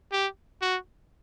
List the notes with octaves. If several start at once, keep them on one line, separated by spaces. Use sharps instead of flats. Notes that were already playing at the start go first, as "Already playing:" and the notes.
G4
F#4